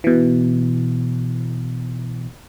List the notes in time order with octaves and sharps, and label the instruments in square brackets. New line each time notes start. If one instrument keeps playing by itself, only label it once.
[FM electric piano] B2 E3